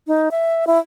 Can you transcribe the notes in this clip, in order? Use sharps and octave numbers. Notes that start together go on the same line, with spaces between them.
D#4
E5
E4